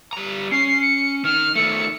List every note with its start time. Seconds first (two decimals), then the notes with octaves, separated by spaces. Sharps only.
0.13 G3 A#5
0.52 C#4 C7
0.82 C#7
1.24 D#3 F6
1.55 D#3 A3 C#7